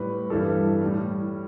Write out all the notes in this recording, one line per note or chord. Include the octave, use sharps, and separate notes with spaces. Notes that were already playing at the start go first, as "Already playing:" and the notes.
Already playing: A2 G3 B4
G2 E3 G3 A4
A2 G3